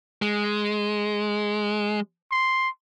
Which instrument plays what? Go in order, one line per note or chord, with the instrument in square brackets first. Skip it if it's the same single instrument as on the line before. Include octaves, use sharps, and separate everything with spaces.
[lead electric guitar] G#3
[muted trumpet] C6